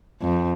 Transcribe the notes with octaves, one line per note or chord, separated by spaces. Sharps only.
F2